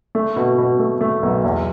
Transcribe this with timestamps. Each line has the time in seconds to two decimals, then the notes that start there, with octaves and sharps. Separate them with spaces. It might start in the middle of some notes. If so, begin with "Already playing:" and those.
0.15 A3
0.36 B2
0.58 B2
0.79 A3
1.01 A3
1.23 B1
1.44 E2